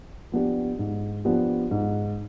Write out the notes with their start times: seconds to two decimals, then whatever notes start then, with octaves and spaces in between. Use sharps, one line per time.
0.32 F3 B3 D4 G4
0.79 G#2
1.25 F3 B3 D4 G4
1.71 G#2